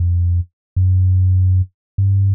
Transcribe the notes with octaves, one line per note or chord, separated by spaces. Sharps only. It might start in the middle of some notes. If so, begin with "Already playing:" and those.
Already playing: F2
F#2
G2